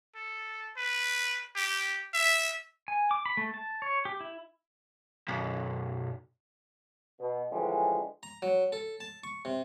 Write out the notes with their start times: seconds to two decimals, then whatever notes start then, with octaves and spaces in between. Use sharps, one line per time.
0.15 A4
0.76 B4
1.56 G4
2.14 E5
2.88 G#5
3.11 D6
3.26 B5
3.37 A3
3.54 A5
3.82 C#5
4.05 G4
4.20 E4
5.28 B1 F#2
7.20 B2
7.52 D3 E3 F3 G3 G#3 C#4
8.23 A#5
8.42 F#3
8.72 A4
9.00 A5
9.24 C#6
9.45 C3